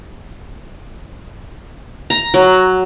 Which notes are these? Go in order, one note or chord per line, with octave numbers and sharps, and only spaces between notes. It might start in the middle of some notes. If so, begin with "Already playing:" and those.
A#5
F#3